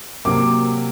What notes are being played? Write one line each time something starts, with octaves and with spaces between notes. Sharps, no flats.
C3 F#3 A#3 D6